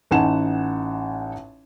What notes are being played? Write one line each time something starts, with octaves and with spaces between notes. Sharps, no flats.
A1 D#4 F#5 G#5 A5 E7